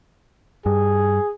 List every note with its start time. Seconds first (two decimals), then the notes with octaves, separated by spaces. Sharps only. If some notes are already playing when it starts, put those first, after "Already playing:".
0.66 G2 G#4